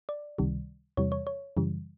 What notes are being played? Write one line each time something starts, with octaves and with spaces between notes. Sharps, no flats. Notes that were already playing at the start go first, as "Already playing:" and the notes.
D5
C#2 C3 D#3 G3
E2 C3 E3 G3 C#5
C#5
C#5
F#2 C#3 E3 G3